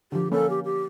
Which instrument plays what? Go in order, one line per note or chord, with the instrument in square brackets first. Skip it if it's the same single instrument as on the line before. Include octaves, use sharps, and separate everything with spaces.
[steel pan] D3 F3 [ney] G4
[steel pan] A#3 C#4 [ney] A4
[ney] G4
G4